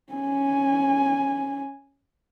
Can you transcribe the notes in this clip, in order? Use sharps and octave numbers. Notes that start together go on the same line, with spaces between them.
C#4 G#5